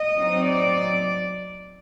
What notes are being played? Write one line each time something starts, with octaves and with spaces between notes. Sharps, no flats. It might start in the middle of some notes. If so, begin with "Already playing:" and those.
Already playing: D#5
F#3 C4 D#4
D5